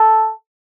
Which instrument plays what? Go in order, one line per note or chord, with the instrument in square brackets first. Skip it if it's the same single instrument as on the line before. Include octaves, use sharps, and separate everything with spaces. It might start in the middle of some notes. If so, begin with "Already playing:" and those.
Already playing: [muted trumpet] A4